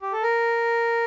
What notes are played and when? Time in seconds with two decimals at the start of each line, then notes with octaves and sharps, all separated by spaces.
0.02 G4
0.12 A4
0.23 A#4